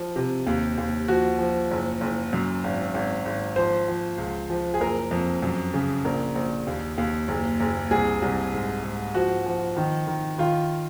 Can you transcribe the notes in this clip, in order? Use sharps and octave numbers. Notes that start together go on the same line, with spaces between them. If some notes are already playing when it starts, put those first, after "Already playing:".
Already playing: F3
C3
D#2
D#2
F3 F#4
F3
F#1
F#1
F#2
G#1
G#1
G#1
F3 C5
F3
C#2
F3
G#4
F#1 A#4
F2
F#2
C#3
A#1 A#4
A#1
D#2
D#2
F#1
F#1
C2 G#4
C2
G#2
G#2
F3 F#4
F3
D#3
D#3
D#3 F4